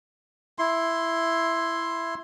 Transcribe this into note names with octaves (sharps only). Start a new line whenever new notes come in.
E4 C6